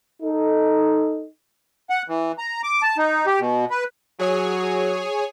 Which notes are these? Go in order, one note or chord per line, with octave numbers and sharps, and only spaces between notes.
D#4 A4
F#5
E3
A#5
D6
A5
D#4
G4
B2
B4
F#3 G#4 C#5 G#5